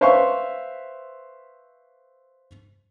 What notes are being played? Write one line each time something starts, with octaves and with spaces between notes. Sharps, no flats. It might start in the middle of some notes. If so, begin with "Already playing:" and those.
B4 C5 E5 F5 C6 C#6